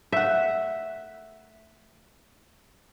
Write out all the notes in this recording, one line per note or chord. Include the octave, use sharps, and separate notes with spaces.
A3 E5 F#5